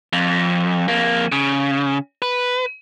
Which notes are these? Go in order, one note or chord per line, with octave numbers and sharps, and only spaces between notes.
F2
F2 A#3
C#3
B4